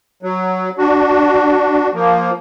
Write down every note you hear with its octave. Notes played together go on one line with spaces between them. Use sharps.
F#3
D4 F#4
F3 A#3